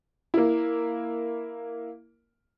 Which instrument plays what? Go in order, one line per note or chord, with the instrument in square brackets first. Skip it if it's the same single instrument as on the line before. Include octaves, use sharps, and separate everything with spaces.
[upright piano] A#3 E4